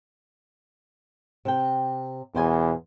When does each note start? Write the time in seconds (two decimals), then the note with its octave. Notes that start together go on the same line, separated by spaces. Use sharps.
1.45 C3 G5
2.35 E2 B2 C5 G#5